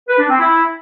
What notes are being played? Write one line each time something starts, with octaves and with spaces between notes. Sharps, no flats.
B4
D4
C4
E4